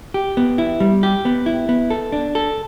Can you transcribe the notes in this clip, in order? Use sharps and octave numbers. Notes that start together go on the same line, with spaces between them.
G4
B3
E4
G3
G4
B3
E4
B3
A4
D4
A4